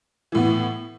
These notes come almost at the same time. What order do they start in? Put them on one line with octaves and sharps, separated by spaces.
E3 A2 B3